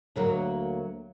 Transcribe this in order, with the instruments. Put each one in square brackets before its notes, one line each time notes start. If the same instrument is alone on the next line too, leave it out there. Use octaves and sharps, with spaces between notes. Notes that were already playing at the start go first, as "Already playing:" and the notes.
[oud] D2 F#3 A#3